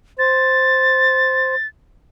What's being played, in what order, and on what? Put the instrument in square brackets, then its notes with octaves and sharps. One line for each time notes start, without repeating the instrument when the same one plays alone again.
[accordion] C5 [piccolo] A6